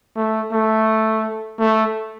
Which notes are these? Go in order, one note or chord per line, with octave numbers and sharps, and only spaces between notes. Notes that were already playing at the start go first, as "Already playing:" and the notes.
A3
A3
A3